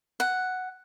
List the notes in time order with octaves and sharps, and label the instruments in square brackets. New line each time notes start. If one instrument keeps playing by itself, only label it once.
[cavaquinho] F#5